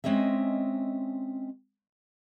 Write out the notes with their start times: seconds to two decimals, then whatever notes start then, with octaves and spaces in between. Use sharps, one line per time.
0.04 G#3 C4 C#4 D#5 E5